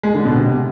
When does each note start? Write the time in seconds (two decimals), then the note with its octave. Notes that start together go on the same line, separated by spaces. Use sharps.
0.03 G#3
0.14 D3
0.25 B2
0.36 C3